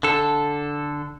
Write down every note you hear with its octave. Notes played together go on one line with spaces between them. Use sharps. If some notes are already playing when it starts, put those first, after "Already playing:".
D3 A4